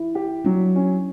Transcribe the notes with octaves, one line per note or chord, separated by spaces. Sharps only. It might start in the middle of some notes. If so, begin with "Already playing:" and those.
Already playing: E4
G4
F#3 D4
C#4